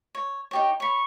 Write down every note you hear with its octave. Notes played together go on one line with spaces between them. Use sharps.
C#5
D#4 G4 C#5
C#5 B5 C#6